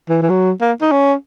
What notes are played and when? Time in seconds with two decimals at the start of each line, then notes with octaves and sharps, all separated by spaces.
0.09 E3
0.22 E3
0.30 F#3
0.61 A#3
0.81 D#4
0.92 C#4